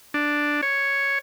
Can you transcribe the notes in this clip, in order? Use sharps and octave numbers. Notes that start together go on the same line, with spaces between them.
D4
C#5